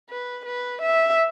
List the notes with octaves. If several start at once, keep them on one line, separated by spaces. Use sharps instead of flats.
B4
B4
E5